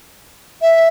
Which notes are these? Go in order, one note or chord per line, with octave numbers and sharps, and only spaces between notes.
E5